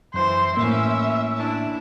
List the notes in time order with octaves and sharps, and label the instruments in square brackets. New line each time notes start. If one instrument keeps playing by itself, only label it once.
[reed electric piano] F#2 [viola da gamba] E3 [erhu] C5
[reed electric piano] A2 A#3 [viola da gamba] E3 C#4 E4 [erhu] E5
[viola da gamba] D4 E4